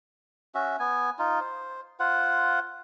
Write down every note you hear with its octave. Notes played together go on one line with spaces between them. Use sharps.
C#4 F#4 E5
B3 G#5
D#4 F4
C5
F4 C5 F#5